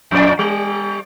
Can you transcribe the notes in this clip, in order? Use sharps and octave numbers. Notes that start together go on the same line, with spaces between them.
F2 A#2 D5
G3